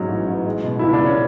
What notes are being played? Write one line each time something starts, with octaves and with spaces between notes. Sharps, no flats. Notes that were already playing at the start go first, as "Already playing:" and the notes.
Already playing: G#2 F#3 C#4
A1
A1
G#3
B2
C#2 E4
D4
C#2 C#4